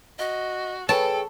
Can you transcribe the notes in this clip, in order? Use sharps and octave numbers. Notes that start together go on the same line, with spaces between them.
F#4 D#5
G#4 A4 B4 C#5 G5 A5